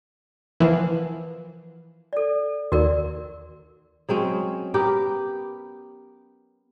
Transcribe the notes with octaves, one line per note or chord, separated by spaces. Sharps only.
E3 F3 A#4 B4 F#5
A4 D5
D#2 F#4 A#4 D5
F#3 G#3 C4 C#4
B3 G4 A#4 B4